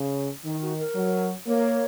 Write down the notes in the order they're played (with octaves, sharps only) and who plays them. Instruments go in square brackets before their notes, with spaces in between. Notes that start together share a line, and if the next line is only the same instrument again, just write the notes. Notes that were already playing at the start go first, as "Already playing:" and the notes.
Already playing: [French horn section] C#3
[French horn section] D#3 [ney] D#4
[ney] F#4
A#4
[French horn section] F#3
[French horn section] A#3 [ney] C#5